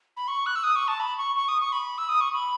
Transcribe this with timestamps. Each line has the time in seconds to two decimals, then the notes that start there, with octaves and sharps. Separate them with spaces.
0.17 B5
0.28 C#6
0.46 F#6
0.56 E6
0.63 D#6
0.76 C#6
0.88 A5
1.00 B5
1.18 C#6
1.36 C#6
1.48 D#6
1.60 C#6
1.72 B5
1.98 E6
2.09 D#6
2.21 C#6
2.33 B5